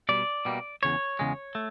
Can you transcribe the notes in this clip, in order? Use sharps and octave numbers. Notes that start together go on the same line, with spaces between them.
B2 G3 D5
B2 G3 A#3
E2 C#3 C#5
E2 C#3 G#3
A3